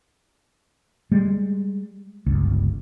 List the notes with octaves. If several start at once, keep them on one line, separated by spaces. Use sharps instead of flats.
G3 G#3
G1 C#2